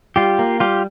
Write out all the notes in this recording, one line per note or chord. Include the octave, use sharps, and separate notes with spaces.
G3 F4 G4
A#3
G3 F4 G4